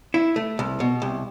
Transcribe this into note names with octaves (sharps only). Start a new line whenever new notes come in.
E4
A3
C2
B2
C2